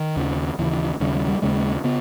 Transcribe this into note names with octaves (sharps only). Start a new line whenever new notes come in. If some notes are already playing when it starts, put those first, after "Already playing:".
Already playing: D#3
D#2 C#3
D#2 C#3 E3
D#2 C#3 G3
G3
G3
D#2 C#3 G#3
C#3 B3